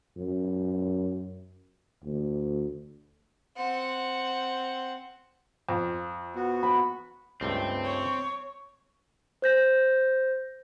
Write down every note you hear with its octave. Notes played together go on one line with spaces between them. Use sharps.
F#2
D2
C4 F#5
F2
B3 F#4
B5
C#2 G2 A3 C4
C#5 C#6
C5 G6 A#6